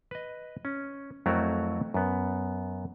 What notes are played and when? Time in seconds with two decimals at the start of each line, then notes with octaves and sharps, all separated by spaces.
0.11 B4 D#5
0.65 C#4
1.26 F2 F#3 A3 E4 F#4 A#4
1.94 F#2 B3